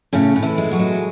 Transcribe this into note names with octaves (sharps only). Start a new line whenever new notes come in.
A2 C#3 C#4
A2
E3 E4
G#3
F#3 F#4
G#3